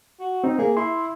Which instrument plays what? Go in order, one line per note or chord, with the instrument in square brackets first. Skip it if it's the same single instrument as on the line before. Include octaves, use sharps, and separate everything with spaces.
[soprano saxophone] F#4
[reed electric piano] C4 [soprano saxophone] D#4
[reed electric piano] A#3 A#4 [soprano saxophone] G#4
[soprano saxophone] E4 [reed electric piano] C6